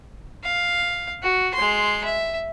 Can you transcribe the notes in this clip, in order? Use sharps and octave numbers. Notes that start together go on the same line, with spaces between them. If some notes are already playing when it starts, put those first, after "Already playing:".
F5
F#4
G#3 C6
E5